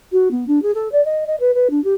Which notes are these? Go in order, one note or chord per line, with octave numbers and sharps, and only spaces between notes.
F#4
B3
D4
G#4
A4
D5
D#5
D#5
B4
B4
D4
G4